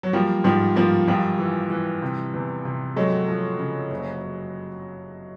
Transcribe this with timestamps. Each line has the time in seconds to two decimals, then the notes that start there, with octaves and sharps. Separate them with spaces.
0.03 F#3
0.13 F3 G3 A#3
0.44 G#2 F3 G3
0.76 F3 G3 A#3
1.08 A#1 F3 G3
1.39 E3
1.70 E3
2.02 C3
2.34 E2
2.65 C3
2.96 F#3 G#3 A3
3.28 F3
3.59 C#3
3.91 F#1